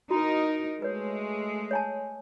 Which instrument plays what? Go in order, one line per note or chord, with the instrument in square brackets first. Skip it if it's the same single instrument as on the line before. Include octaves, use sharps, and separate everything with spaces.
[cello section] D#4 A#4 [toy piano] E4 F#4
[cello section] G#3 A3 [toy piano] B4 C#5
[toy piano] C#5 G#5 A5